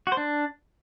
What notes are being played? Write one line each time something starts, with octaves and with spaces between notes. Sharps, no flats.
F#4
C5
D4